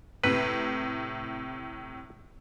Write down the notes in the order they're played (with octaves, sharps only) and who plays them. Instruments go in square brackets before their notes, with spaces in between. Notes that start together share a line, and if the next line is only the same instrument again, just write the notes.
[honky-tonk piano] A2 C3 [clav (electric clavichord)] B4